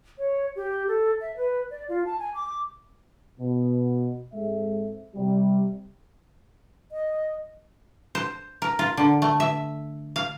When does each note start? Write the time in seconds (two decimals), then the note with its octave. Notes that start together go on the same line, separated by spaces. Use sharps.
0.18 C#5
0.56 G4
0.88 A4
1.21 E5
1.37 B4
1.71 D5
1.89 F4
2.05 A5
2.20 G#5
2.35 D6
3.39 B2
4.34 G#2 G#3 C4 A4 E5
5.16 C3 G3
6.92 D#5
8.15 C5
8.62 A#4
8.79 F4
8.97 D3
9.22 A3
9.40 E5
10.16 F5